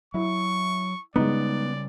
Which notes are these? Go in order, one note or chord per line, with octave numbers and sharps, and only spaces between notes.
F#3 E4 C#6
C#3 G3 G#3 B3 D#4 D5